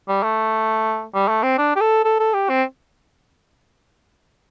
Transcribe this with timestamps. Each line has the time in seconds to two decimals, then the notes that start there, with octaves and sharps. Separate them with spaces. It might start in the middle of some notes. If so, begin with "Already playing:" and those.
0.08 G3
0.23 A3
1.14 G3
1.29 A3
1.43 C4
1.58 D4
1.76 G4
1.81 A4
2.05 A4
2.20 A4
2.34 G4
2.49 C4